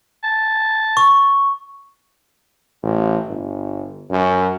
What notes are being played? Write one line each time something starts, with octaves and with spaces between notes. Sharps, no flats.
A5
C#6
A1
G1
F#2